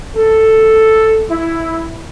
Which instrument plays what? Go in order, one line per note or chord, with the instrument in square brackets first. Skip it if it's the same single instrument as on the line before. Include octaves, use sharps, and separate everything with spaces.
[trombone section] A4
E4